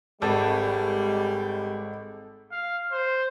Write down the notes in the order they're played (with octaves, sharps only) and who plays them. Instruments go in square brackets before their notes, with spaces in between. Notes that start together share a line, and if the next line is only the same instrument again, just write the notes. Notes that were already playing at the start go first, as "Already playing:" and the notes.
[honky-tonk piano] G#1 [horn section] G3 [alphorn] G#3 [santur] A4 G#5 A5
[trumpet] F5
C5